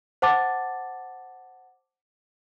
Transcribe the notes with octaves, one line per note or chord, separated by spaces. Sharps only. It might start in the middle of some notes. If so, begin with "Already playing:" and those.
C5 F#5 A5 D6 A6